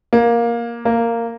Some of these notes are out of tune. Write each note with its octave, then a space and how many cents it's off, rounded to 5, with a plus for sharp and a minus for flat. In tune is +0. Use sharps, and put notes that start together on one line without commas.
A#3 +10
A#3 -10